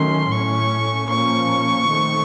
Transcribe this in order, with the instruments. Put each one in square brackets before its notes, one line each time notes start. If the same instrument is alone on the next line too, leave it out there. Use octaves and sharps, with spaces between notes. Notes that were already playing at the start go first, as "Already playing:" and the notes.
Already playing: [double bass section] D#3 F#3 A3 C#4 [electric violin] C6
[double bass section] A2 A3 C#4 [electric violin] C#6
[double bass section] A#2 F3 A#3 C#4 [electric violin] C#6
[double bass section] D#3 A3 C4